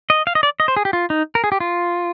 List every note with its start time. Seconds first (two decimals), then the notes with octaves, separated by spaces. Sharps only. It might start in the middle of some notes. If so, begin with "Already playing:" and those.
0.10 D#5
0.27 F5
0.35 D#5
0.43 D5
0.60 D#5
0.68 C5
0.77 G#4
0.85 G4
0.93 F4
1.10 D#4
1.35 A#4
1.44 G#4
1.52 G4
1.60 F4